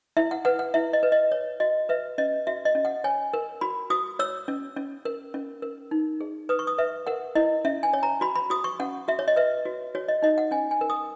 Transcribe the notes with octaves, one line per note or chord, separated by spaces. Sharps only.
E4 E5
F#5
B4 F#5
F#5
E4 E5
D#5
B4
D#5
C#5
F#4 D#5
B4 E5
C#4 D#5
F#4 E5
D#5
C#4
F#5
C#5 G#5
A#4
F#4 B5
F#4 D#6
C#5 E6
C#4
C#4
A#4
C#4
A#4
D#4
G#4
B4 D#6
C#6
D#6
B4 E5
A#4 F#5
E4 D#5
C#4 E5
G#5
C#5
A#5
F#4 B5
B5
F#4 D#6
C#6
C#4 F#5
F#4 E5
C#5
D#5
B4 E5
F#4
F#4 C#5
D#5
D#4 D#5
F#5
C#4 G#5
G#5
A#4
D#6